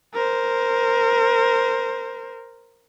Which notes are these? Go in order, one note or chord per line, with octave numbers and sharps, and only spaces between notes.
A#4 C5